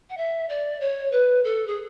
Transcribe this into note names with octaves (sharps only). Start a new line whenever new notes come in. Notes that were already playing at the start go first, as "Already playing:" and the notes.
F#5
E5
D5
C#5
B4
A4
G#4